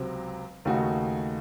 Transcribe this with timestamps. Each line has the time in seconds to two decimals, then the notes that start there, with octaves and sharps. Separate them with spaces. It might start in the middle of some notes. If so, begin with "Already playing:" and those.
Already playing: C#2 C3 F#3 C4
0.65 D#2 C#3 A3 D#4 F#4